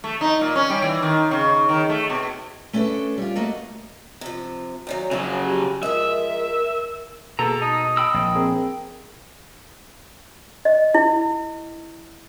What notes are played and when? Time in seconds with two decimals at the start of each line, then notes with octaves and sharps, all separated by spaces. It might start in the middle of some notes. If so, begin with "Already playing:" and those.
0.04 A3
0.21 D#4
0.41 A#2
0.55 C#4
0.70 G3
0.82 E3
1.02 D#3
1.31 C#3
1.69 D#3
1.89 A3
2.10 B2
2.73 A3 C#4 D4 F#4 A4 B4
3.18 G3 F4
3.36 A3 A#3 F#4 D#5
4.21 C3 F3
4.87 D2 D#3 F#3 C#5
5.11 F#2 C#3 F3 F#3
5.43 G4
5.83 F3 G#3 A#4 E5
7.39 B2 A#3 B3 G#4 A4 A#5
7.62 D#4 D#5 A5
7.97 G5 B5 E6
8.14 A#1
8.35 C4 G#4 A#4
10.65 D#5
10.94 E4